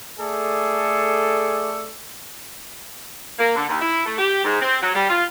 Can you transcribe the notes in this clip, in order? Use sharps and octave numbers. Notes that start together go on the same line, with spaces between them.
A3 G#4 A4 D5
A#3
D3
D#2
E4
A3
G4
G#2
C4
F#3
G3
F4